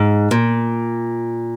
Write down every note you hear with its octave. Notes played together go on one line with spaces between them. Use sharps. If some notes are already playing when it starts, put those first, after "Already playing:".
Already playing: G#2
A#2